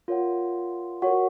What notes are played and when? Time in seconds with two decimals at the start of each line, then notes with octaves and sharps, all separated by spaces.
0.08 F4 A#4 C#5 F#5
1.02 F#4 A#4 C#5 F#5